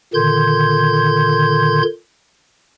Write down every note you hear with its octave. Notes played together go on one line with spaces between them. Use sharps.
A#2 D3 D#3 C6 G6 G#6